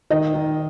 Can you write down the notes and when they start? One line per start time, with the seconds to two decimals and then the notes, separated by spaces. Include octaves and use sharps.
0.11 D#3 D#5
0.34 D#3